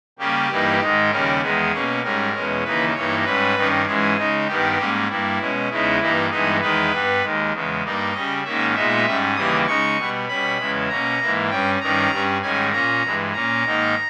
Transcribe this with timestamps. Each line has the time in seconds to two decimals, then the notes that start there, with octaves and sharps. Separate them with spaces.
0.19 C#3 G3 A#3 C#4 G4
0.49 G2 E3 G3 A#3 D#4
0.80 G#2 D#3 G#3 D#4
1.10 D#2 C#3 G3 C#4 A#4
1.41 E2 D#3 G#3 B3 G#4
1.72 B2 A#3 C#4
2.03 G#2 G3 C#4 A#4
2.33 E2 B2 G#3 C#4
2.63 D#2 C#3 E3 A#3 D#4 B4
2.94 G2 E3 A#3 D#4 C#5
3.24 G#2 G3 C#4 B4
3.55 G2 D#3 G3 C#4
3.85 G#2 E3 G#3 C#4 G#4
4.16 C#3 G#3 D#4
4.47 G2 D#3 G3 B3 G4
4.78 G#2 G3 A#3 C#4
5.08 G2 G3 A#3 E4
5.39 B2 G#3 C#4
5.69 E2 C#3 G#3 B3 D#4 E4
6.00 G2 E3 A#3 D#4
6.30 G2 E3 G#3 B3 D#4 G#4
6.61 E2 D#3 G#3 D#4 B4
6.91 G2 G3 B3
7.22 D#2 D#3 G#3
7.52 E2 C#3 G#3
7.83 G2 G3 A#3 D#4
8.13 C#3 G3 C#4 D#5
8.44 G#2 D#3 A#3 C#4 E5
8.74 A#2 G#3 B3 D#4 E5
9.06 G#2 G3 C#4
9.36 D#2 C#3 E3 G3 A#3 D#6
9.67 C#3 G#3 D#4 C#6
9.97 B2 G3 B3
10.27 B2 G3 C#4 B5
10.58 E2 C#3 E3 G#3
10.88 B2 A#3 C#4 A#5
11.19 G#2 E3 A#3
11.50 G2 G3 C#4 G5
11.80 G2 D#3 G3 C#4 A#5
12.11 G2 G3 C#4
12.42 G#2 D#3 G3 C#4 G#5
12.72 A#2 A#3 C#4 A#5
13.03 G2 E3 G#3
13.33 A#2 A#3 C#4 A#5
13.64 G#2 D#3 A#3 D#4